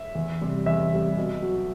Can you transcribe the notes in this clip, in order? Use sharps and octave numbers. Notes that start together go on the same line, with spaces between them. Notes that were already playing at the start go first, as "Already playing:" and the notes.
Already playing: E5
E2
C3 G3
E2 E5
C3 G3
B2
F#3